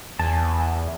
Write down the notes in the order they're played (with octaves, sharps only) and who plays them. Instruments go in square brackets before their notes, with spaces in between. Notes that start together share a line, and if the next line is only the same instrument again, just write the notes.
[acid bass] E2 [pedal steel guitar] G#5 A5